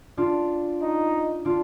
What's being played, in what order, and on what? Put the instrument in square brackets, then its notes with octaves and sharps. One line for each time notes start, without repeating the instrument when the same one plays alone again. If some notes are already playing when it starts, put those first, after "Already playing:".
[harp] D4 F4
[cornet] D#4
[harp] D4 F4